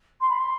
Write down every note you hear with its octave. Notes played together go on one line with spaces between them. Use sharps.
C6
B5
C6